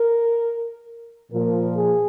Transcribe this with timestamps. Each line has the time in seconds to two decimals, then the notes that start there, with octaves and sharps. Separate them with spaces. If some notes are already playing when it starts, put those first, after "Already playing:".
Already playing: A#4
1.31 A#2 F3 A#4
1.76 G#4